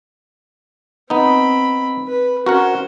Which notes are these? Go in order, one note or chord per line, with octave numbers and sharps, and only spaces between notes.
B3 C4 D#4 B5
B4
C#4 F#4 A#4 C5 F#5